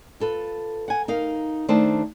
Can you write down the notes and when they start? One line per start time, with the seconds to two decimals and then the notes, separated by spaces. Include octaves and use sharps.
0.20 F4 A4 B4
0.88 F#5 G#5
1.08 D#4 A#4 F5
1.68 D#3 A3 D4 C5 A5